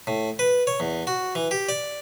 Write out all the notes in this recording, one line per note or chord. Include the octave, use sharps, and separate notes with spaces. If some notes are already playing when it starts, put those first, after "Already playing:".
A2
B4
C#5
E2
F#4
E3
G4
D5